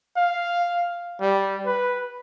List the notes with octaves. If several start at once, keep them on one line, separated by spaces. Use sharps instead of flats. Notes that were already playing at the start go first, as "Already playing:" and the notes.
F5
G3
B4